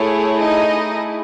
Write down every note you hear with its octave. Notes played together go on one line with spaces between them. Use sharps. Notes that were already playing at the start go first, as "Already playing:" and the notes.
Already playing: A3 E4 G#4 C#5
D#4 D#5